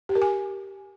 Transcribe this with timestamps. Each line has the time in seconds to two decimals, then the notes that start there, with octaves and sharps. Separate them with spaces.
0.09 G4
0.15 A#4
0.22 G#5